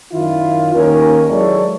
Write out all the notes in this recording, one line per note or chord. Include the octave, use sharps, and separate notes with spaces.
F#2 D#3 E4 F4
D#2 C#4 A#4
F#3 G#3 E4 A4 C#5 D5